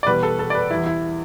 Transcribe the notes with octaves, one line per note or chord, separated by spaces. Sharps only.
D5
E2 B2 G3 B4
A4
A4
D5
B4
E2 E3 G3 E4
E4